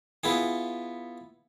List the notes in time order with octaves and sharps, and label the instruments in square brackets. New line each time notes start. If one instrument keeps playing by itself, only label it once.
[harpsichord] B3 E4 F4 G#4